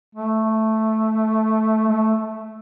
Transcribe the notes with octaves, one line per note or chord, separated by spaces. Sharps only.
A3
A3